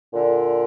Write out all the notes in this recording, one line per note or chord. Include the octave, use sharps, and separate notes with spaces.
A#2 D3